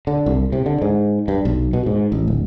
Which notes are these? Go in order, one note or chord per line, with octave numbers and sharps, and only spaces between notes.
D3
C2
C3
D3
G#2
G2
B1
B2
G#2
A1
D1